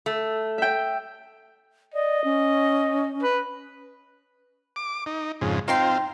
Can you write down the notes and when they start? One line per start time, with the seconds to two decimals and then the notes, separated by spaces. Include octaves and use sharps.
0.06 A3
0.58 E5 G5
1.94 D5 D#5
2.24 C#4
3.22 B4
4.76 D6
5.06 D#4
5.41 F2 G#2 C#3
5.68 C4 D#4 F4 G5 C6